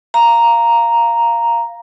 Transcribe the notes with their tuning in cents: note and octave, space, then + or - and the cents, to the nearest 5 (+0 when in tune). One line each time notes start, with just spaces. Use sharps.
F5 -10 A#5 +0